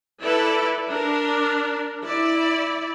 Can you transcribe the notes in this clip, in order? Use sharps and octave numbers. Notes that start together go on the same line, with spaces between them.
E4 A4 B4 D5
D4 A#4
E4 D5